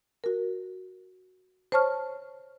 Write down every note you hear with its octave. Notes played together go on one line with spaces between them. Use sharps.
F#4 A#4
C5 C#5 A5 C#6 F6